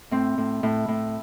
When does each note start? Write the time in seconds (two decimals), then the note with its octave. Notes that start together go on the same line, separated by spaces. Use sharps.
0.11 A2 C4
0.38 A2
0.63 A2
0.88 A2